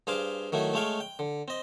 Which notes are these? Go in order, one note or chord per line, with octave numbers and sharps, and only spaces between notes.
G2 G#4 C5 F5 D6
D#3 F#3 A3 E4
G#3 A3 C#5 F5 G5
G5
D3
C4 D#5